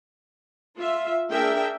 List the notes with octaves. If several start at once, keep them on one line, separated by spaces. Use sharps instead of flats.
F4 E5
A#3 D4 G#4 A#4 E5 G5